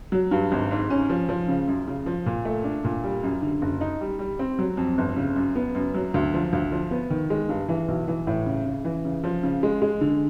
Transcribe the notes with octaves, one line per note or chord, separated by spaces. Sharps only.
F#3
G2
G#1
G#2
C#4
F3
F3
C#3
F#2
C#3
F3
A#2
A3
D4
A#2
G3
F#2
D3
F#1
D#4
G3
G3
C4
F#3
F2
G1
C#3
F#2
B3
F#2
F#3
D2
F3
D2
F3
B3
D#3
G#3
G2
E3
B1
E3
A2
C#3
C#3
E3
C#3
F3
C#3
G#3
G#3
D3